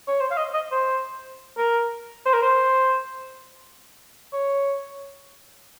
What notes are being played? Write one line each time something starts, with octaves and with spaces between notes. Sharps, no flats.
C#5
C5
F5
D#5
D#5
C5
A#4
C5
A#4
C5
C#5